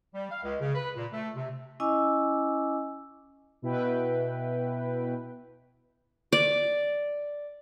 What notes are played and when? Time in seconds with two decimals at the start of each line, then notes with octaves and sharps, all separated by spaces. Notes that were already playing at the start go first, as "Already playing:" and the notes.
0.14 G3
0.30 F5
0.43 C#2
0.60 C#3
0.75 B4
0.96 A#2
1.12 A3
1.35 C3
1.80 C#4 E4 D#5 G#5 D6 E6
3.62 B2 E4 B4 G5
6.32 D5